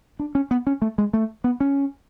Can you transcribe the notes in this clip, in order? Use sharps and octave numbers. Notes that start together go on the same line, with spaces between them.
D4
C#4
B3
C#4
A3
G#3
A3
B3
C#4